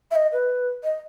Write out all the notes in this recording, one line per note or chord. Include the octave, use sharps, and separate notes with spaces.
E5
D#5
B4
D#5